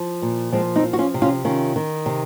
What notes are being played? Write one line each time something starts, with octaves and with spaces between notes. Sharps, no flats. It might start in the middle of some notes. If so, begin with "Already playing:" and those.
Already playing: F3
A#2
F3 G#3 C4
C4 D#4
F3
F#4
C#4 F4
C3
C#4 F4
D#3 C#4 F4
D#3
C3